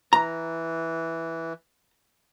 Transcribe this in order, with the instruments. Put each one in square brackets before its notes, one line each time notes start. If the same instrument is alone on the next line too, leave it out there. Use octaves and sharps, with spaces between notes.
[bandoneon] E3 [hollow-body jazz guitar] A#5